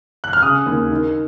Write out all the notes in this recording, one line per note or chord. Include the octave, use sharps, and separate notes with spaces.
F#6
F6
C#3 D#6
D#2
D#3